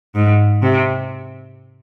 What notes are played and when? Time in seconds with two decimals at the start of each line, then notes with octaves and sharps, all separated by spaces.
0.15 G#2
0.62 C3